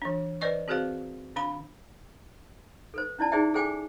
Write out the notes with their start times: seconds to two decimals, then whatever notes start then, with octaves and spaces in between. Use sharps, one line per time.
0.02 E3 D4
0.41 B4 C5 D5 D#5 C#6
0.68 C4 F#4 G#4 A#4 C5 F5
1.36 D#3 D4 F5 B5
2.94 A4 B4 C5
3.19 C#4 E4 D5 A5
3.32 D#4 G#4 C5 D5 E5 G5
3.54 G#4 A4 C5 G5 G#5 D6